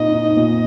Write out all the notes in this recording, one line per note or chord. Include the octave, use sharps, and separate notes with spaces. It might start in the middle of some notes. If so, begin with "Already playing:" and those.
Already playing: A#2 C4 D#4 D#5
D#4
A#2